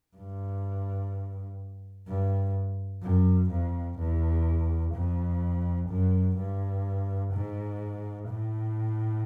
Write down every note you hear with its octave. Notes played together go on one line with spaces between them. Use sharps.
G2
G2
F#2
F2
E2
F2
F#2
G2
G#2
A2